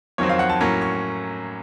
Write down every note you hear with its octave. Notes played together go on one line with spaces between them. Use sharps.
F2 D#3 F#3 C4 C#5
F5
F#5
A5
A2 F#3 A#3 C#4 A#5
C#6